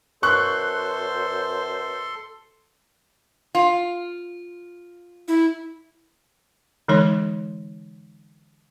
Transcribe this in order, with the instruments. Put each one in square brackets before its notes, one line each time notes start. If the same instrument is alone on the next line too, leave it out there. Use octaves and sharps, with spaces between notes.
[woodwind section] F#2 B2 C5 [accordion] A4 C6 [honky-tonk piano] C#6 F#6
[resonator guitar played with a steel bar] F4
[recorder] E4
[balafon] D3 E3 G#3 D#4 C#5 C6